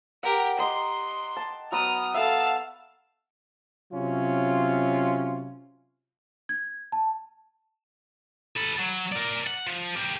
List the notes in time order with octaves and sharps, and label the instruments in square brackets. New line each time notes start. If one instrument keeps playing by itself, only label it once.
[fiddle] G4 A#4 [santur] F#5
[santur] G4 D#5 A#5 [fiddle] C6
[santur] A5
[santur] F#3 B3 A#5 [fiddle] D#6 F6
[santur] A4 E5 [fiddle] F5 A5
[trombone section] C3 F#3 C#4 F4
[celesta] G#6
A5
[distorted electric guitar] A4 B4
F#3
A#4 D5
F#5
F3
G4 A#4